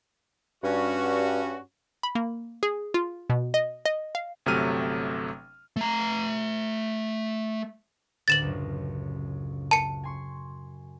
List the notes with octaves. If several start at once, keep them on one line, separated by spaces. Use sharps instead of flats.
G2 C#4 F#4
B5
A#3
G#4
F4
B2
D#5
D#5
F5
G1 C3 F#3 A3 F6 D#7
A3 A#5
A1 D2 D3 A6 E7 F#7
C#2 F#2
A5 C#7
G#5 C6 C#6